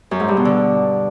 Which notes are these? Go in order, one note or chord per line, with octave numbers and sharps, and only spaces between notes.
F#2
G#2
G2
B2
D3